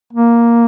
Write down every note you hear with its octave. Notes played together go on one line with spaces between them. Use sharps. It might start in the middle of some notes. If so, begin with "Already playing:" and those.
A#3